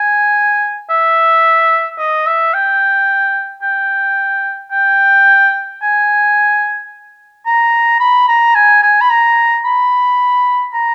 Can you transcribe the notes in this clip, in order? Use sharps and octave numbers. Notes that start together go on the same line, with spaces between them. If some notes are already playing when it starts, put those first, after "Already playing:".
Already playing: G#5
E5
D#5
E5
G5
G5
G5
G#5
A#5
B5
A#5
G#5
G#5
B5
A#5
B5
A#5